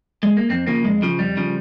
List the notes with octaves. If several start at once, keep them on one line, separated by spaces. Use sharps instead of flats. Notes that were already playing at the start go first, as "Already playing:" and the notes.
G#3
A#3
F2 C4
C#3 F3 A#3
F2 G#3
C#3 F3
F2 G3
C#3 F3